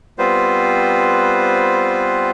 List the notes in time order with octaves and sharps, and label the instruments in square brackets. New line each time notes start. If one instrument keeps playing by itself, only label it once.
[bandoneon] G3 B3 C4 F4 B4 C5